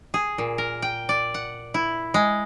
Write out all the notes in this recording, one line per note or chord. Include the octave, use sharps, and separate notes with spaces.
G#4
A#2
A#4
G5
D5
F#5
E4
G#3